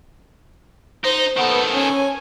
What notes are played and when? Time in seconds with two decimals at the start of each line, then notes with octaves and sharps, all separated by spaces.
1.04 D#4 C5 A#6
1.37 D#3 B3 A4 G6
1.73 C#4 G#5